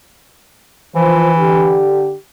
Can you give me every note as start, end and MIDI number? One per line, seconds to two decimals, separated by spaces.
0.95 1.80 52
0.95 1.28 53
0.95 1.28 72
1.38 2.13 50
1.38 2.13 67